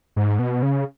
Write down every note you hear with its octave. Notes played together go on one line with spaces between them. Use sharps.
G#2
B2
C#3